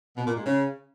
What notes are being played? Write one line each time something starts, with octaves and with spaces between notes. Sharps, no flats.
B2
A#2
G#2
C#3